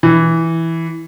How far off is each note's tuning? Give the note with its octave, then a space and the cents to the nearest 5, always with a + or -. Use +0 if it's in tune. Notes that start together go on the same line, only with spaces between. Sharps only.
E3 -5